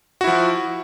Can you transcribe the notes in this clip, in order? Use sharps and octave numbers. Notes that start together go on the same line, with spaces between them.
F3 E4 F#4